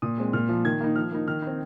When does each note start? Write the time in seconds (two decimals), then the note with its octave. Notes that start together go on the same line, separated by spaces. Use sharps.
0.02 A#2 D#6
0.18 G#3 C4
0.33 A#2 F6
0.49 F3 A#3
0.65 D#3 G#6
0.80 A#3 D#4
0.96 F3 F6
1.12 A#3 D#4
1.27 D#3 F6
1.42 C4 D#4